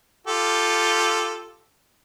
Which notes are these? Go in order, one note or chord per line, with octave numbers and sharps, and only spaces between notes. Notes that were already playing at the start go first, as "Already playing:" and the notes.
F4 G4 A4